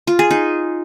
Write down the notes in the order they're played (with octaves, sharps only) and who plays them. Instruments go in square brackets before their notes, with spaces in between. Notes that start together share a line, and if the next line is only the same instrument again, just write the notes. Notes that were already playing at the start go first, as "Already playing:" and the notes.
[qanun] F4
G#4
D#4